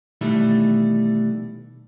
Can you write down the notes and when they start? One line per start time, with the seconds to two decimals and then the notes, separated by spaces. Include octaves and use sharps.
0.21 B2 D#3 E3 G3 A3 E4